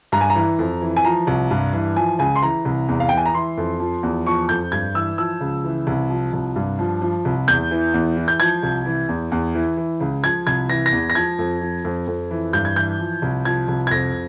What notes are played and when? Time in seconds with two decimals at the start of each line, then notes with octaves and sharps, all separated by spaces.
0.12 G2 A#5
0.21 G#5
0.30 A#5
0.35 E3
0.59 F2
0.82 E3
0.96 G#5
1.05 F3 A#5
1.27 C2
1.51 G2
1.73 E3
1.96 F3 G#5
2.19 C#2 G#5
2.36 C6
2.42 E3 A#5
2.65 C2
2.89 E2
3.00 F5
3.09 E3 G5
3.17 G#5
3.26 A#5
3.34 E3 C6
3.57 F2
3.80 F3
4.03 E2
4.26 F3 C#6
4.49 F2 G6
4.72 G2 G#6
4.94 E3 E6
5.18 F3 E6
5.41 C#2
5.64 E3
5.87 C2
6.10 F3
6.33 C2
6.56 G2
6.79 F3
7.02 F3
7.25 C2
7.47 E2 G6
7.71 E3
7.94 E2
8.16 E3
8.28 G6
8.39 F3 G#6
8.63 C2
8.86 E3
9.09 E2
9.32 E2
9.55 E3
9.77 E3
10.00 C#2
10.23 F3 G#6
10.47 C2 G#6
10.69 E3 A#6
10.86 A#6
10.92 E2
11.10 A#6
11.15 F3 G#6
11.39 F2
11.61 F3
11.85 F2
12.07 F2
12.30 E3
12.53 G2 G6
12.65 G#6
12.76 E3 G6
12.99 F3
13.22 C2
13.45 F3 G#6
13.68 C2
13.87 G#6
13.91 F2 A#6